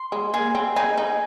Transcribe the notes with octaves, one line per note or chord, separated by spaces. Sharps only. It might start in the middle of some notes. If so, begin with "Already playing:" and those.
Already playing: C6
G#3
A#3 G#4
C4
D#4 G#4
D#4